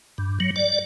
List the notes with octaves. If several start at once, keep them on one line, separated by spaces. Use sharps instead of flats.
G2
F#3
D5